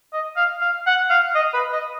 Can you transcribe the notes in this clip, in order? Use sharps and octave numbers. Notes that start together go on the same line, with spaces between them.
D#5
F5
F5
F#5
F5
D#5
B4
D#5